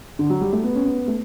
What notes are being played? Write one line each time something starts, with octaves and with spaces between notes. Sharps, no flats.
D3
F#3
G3
A3
B3
C#4
B3
A3